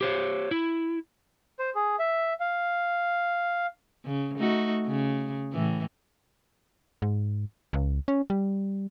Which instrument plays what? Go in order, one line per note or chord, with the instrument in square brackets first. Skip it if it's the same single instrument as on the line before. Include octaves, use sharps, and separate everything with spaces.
[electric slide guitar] G4 C5 C#5
E4
[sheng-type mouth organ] C5
G#4
E5
F5
[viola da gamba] C#3
A3 D#4 F#4
C#3
A2 E3
[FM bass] G#2
C#2
C#4
G3